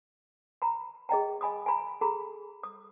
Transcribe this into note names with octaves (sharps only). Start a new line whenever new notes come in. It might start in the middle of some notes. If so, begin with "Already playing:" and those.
A#5 B5
G#4 D#5 G5 A#5
D#5 G#5 B5 D#6
G#5 A#5 B5
G#4 A4 A#5 B5
D#6